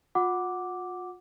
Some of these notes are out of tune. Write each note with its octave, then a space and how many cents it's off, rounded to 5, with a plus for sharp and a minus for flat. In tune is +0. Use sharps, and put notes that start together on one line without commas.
F4 +40 F#5 +0 D6 +0